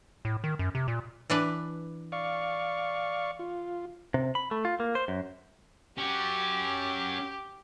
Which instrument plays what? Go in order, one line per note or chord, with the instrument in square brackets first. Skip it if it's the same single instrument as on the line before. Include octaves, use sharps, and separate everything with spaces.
[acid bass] A2
D#3
F#2
C3
A#2
[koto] E3 D4 B4
[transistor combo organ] D5 F5 C#6
F4
[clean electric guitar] C3
B5
A3
F4
A#3
C5
F#2
[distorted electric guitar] C#4 F#4 [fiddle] G4